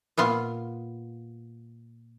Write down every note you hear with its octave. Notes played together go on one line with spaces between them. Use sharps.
A#2 B3 F4